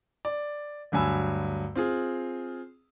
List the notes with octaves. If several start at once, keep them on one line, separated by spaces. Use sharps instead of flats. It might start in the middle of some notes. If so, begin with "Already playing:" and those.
D5
D2 G2 F#3 G#5 B5 E6
C4 F4 G#4